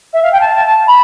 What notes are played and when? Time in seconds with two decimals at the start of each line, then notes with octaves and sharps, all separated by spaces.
0.13 E5
0.23 F5
0.32 G5
0.40 A5
0.87 B5